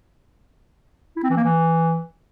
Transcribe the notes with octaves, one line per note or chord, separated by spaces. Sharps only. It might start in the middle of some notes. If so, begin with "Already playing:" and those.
E4
C4
E3
A#3
E3